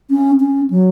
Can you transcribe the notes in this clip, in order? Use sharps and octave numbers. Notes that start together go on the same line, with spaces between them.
C#4
C#4
F#3